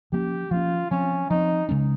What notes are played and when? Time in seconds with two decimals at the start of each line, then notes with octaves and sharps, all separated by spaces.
0.12 F3 A#3 C#4 G4
0.51 F3 A#3 C#4 F4
0.91 F3 C4 C#4
1.30 F3 C4 D#4
1.69 C#3 G#3 C#4